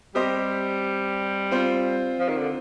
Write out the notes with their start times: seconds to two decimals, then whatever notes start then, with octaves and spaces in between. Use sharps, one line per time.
0.15 G3 C4 G4 C5 D#5
1.51 C4 F4 C5
2.20 F3
2.28 D#3
2.37 D3